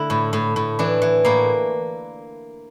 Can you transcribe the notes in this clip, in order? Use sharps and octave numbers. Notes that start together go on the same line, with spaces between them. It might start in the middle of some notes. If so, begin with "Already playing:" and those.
Already playing: D3 A3 E4
A2
A2
A2
E3 D4
E3
A2 A#3